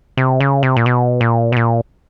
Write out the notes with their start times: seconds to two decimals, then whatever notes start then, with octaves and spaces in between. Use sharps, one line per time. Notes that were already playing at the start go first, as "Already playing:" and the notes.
0.17 C3
0.40 C#3
0.63 C3
0.77 A#2
0.86 B2
1.21 A#2
1.52 B2
1.57 A#2